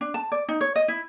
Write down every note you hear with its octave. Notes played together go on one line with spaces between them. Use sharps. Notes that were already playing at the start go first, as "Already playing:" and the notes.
D4
A5
D5
D#4
C#5
D#5
E4